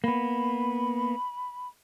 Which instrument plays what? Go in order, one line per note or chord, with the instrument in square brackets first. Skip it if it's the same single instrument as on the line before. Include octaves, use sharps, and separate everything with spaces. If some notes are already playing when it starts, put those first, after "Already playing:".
[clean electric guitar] A#3 B3 [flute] B5